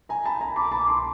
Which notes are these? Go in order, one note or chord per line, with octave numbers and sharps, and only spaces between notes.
G#5 A#5
A5 B5
G#5 A#5
A5 B5 D6
A5 B5
C6 D6